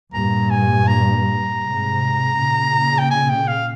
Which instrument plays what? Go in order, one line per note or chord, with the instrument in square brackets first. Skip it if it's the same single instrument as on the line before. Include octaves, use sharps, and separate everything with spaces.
[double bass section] G2 A#2 [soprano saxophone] A#5
[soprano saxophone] G#5
A#5
[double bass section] G#2 C3
A#2 C#3
[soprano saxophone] G5
G#5
G5
F5